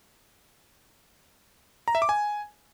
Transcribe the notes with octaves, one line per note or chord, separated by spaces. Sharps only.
A#5
E5
D6
G#5